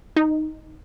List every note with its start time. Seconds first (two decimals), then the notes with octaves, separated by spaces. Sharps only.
0.16 D#4